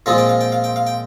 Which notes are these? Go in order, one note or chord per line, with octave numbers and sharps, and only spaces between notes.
A#2 F3 G#3 C4 F4 F5
G5
F5
G5
F5
G5
F5
G5